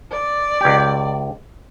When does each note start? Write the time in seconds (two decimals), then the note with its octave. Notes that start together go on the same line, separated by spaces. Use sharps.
0.11 D5
0.61 C#2 G4